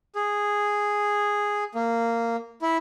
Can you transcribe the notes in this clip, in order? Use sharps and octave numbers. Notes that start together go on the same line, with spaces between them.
G#4
A#3
E4